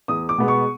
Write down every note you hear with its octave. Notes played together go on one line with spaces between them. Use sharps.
E2 D#6
D6
B2 G#3 B3
C#6